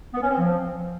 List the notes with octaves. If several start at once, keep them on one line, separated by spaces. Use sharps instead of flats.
B3
C#4
C4
F3